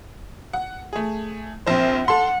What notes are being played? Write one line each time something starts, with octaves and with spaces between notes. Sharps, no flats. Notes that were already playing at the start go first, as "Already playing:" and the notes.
F#5
A3 G#4
A#1 C4 C5
A4 F#5 C6